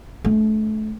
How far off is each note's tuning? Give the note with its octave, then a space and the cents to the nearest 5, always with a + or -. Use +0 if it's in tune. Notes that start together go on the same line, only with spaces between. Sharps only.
A3 -30 D4 -40